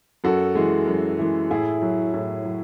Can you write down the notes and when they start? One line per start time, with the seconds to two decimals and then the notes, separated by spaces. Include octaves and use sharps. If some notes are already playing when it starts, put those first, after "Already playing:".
0.24 F#2 F#4 A4
0.55 E3 G#3
0.87 F#2
1.19 E3 G#3
1.50 A2 E4 G#4
1.82 F#3
2.14 A2
2.45 F#3